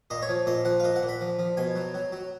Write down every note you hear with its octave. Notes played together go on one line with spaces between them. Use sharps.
A#2 D#5
C#5
F3
A#2 D#5
F3 F#5
F5
A#2 D#5
F#5
A#2
B5
F3
F3
B2 G#5
F#3
F#3
F#3